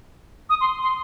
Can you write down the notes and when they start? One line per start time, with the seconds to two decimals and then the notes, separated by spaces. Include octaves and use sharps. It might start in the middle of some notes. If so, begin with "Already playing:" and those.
0.50 D#6
0.61 C6
0.82 C6